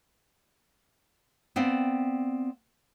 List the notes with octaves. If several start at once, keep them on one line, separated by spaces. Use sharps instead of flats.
B3 C4 D5 F5 G5